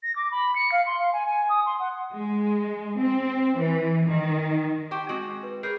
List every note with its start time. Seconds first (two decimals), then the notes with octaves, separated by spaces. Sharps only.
0.03 A#6
0.16 D6
0.31 B5
0.55 C#7
0.72 F5
0.86 C6
0.99 F5
1.13 G#5
1.26 G#5
1.49 D#6
1.66 C6
1.79 F#5
2.14 G#3
2.99 C4
3.58 E3
4.08 D#3
4.91 G4 C5 G5 C#6 D6
5.09 G#3 C4 F#4
5.43 B4
5.63 G#4 A#4 B4 C#5 G6 C7